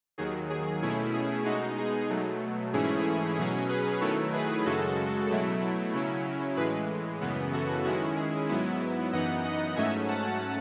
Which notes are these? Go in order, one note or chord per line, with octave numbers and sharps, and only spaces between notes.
D#2 D#3 F#3 G#4
G#4
B2 A3 C#4 E4 G#4
G#4
B2 G#3 D#4 F#4
G#4
B2 F#3 A3
G#2 E3 A3 C#4 E4 G#4
B2 F#3 C#4 G#4
G#4 B4
D#3 F#3 A3 E4 A4 C#5
G#4 B4
F#2 C#3 G#3 F#4 A4
B2 F#3 A3 E4
C#3 F#3 C#4 E4
A2 E3 G#3 G#4 B4
F#2 C#3 E3 B3
F#4 A4
D#3 G#3 C#4 E4 F#4
G#4
G#2 F#3 B3 E4
F#2 E3 B3 D#4 D#5 F#5
D#5 F#5
G#2 F#3 A3 C#4 E5 G#5
F#5 A5